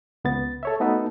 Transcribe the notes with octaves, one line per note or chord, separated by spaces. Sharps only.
C#2 B3 A6
A4 C#5 E5
A3 B3 D#4 F#4 A4 B4